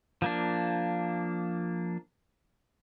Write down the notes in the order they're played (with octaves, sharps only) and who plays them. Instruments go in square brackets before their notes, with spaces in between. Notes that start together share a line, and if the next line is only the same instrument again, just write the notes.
[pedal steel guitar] F3 A#3 D4